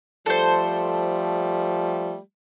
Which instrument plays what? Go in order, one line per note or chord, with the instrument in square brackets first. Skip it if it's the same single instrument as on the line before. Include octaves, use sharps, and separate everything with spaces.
[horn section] F3 G3 A3 [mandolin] A4 C5